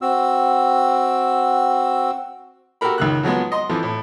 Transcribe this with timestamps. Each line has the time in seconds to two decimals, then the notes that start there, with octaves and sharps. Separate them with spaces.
0.02 C4 F#4 E6
2.81 F#4 G4 A4 A#4 B5
2.98 C#2 D#3 F#6
3.23 F3 F#3 G#3 B3
3.52 D#5 C6
3.69 F2 E3 F3
3.83 A2